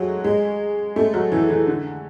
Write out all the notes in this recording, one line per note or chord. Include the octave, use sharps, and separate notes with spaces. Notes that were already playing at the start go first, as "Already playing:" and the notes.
Already playing: F#3 G#3 A3
G#3
A3
F#3
E3
E3
D3